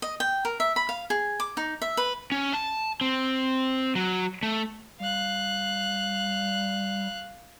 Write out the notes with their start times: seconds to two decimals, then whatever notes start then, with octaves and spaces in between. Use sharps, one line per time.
0.02 D#5
0.20 G5
0.45 A#4
0.60 E5
0.76 B5
0.89 F5
1.10 G#4
1.40 D6
1.57 D#4
1.82 E5
1.97 B4
2.32 C#4
2.54 A5
3.01 C4
3.95 F#3
4.43 A3
5.00 G3 F5 F#6